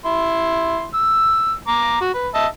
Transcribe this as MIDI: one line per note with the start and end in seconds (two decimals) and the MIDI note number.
0.05 0.85 64
0.05 0.85 84
0.94 1.53 88
1.68 1.98 82
1.68 1.98 86
2.01 2.11 66
2.14 2.28 71
2.35 2.47 75
2.35 2.47 76
2.35 2.47 81